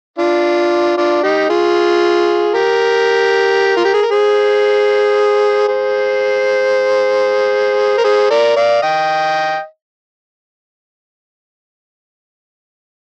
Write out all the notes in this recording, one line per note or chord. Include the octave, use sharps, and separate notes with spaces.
D4 F4
D4 F4
D#4 G4
F4 G#4
G4 A#4
F4
G4
G#4
A#4
G#4 C5
G#4 C5
A#4
G#4 C5
A#4 D5
D5 F5
D#5 G5